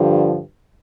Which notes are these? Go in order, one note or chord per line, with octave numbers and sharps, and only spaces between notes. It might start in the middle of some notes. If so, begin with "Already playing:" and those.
Already playing: G2 D3 F3